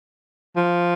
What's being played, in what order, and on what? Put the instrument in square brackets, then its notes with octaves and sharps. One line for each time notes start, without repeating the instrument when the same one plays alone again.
[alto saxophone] F3